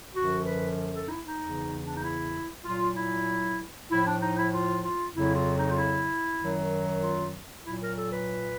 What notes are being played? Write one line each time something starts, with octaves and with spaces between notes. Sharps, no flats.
F#2 D3 F3 F#4
B4
A4
D#4
E4
D#4
E2 C#3 E3
D4
D#4
E4
A#2 F#3 F4
E4
A2 F3 E4
D4
D#4
E4
F4
F4
F2 C#3 F#3 E4
F4
D#4
F4
E4
F#2 D#3 F#3
F4
A#2 F#3 E4
A#4
A4
B4